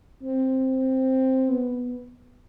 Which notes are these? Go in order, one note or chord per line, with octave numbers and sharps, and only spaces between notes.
C4
B3